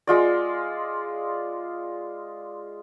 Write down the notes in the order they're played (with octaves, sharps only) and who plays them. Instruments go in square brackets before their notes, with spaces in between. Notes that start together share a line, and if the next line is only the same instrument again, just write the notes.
[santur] G#3 F4 D5